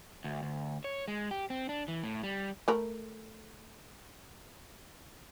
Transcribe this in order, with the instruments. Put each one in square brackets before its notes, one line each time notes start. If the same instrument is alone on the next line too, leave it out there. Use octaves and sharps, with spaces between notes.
[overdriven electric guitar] D2
D2
C#5
G#3
G4
C4
D4
E3
A2
G3
[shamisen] A3 A#4 B5